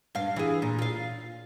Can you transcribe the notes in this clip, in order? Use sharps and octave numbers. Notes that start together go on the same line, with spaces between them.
G2 F5
E3 G#4
A#2
F4 F5